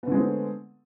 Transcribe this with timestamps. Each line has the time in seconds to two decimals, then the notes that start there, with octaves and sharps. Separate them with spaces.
0.03 B3
0.07 D3
0.12 G#3
0.16 C4
0.21 A3